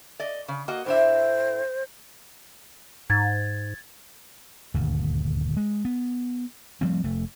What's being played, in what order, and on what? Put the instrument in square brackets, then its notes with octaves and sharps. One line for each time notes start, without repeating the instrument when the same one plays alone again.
[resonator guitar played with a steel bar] D5 D#5
C#3
A#3 F#4 D#5
[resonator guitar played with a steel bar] A2 D4 E5 [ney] C5
[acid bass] G#2 [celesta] G#6 A6
[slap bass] D#1 D2 G2
G#3
B3
F3 G3 A3 C4
F1 A3